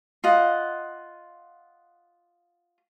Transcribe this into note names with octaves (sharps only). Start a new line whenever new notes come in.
F4 D#5 F#5